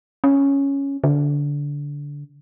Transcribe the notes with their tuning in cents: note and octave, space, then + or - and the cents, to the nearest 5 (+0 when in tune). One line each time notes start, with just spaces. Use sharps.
C#4 +0
D3 -20